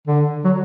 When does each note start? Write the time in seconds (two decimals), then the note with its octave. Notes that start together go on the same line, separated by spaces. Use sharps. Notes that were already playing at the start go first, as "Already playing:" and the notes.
0.07 D3
0.45 F#3